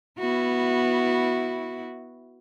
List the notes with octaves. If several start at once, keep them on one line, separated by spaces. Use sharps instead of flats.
B3 E4 F#4